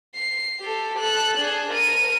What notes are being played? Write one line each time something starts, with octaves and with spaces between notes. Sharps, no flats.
C7
G4 A4
A4 F#6
D4 G#4
A#4 D#7